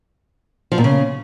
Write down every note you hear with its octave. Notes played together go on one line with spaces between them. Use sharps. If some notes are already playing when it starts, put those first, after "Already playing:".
F3
A#2
C#3